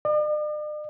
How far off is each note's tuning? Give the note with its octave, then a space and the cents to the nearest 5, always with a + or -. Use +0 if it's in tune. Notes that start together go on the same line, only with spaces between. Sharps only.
D5 +45